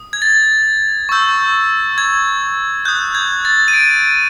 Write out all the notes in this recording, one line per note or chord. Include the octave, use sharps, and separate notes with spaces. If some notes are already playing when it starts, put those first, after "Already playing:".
Already playing: D#6
G#6
A6
C#6 E6 G6
G#6
D#6 F#6 G6
G#6
A6
D#7
D7